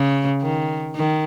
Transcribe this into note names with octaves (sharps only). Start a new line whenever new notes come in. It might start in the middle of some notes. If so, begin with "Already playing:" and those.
Already playing: C#3
D#3
D#3